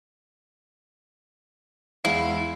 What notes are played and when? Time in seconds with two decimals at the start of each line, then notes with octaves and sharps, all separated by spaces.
2.05 E2 G#3 E4 F5